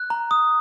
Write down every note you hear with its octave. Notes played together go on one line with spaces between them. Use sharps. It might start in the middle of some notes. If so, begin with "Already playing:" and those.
Already playing: F#6
A#5
D#6